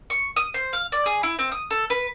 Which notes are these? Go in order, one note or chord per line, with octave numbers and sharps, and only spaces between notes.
C#6
D#6
C5
F5
D5
G#4
E4
C4
D#6
A4
B4